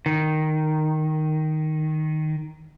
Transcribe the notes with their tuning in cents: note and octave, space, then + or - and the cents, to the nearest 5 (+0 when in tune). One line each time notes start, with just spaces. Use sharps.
D#3 -5